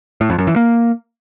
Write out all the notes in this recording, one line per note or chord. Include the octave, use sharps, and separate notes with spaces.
A2
F2
F#2
E3
A#3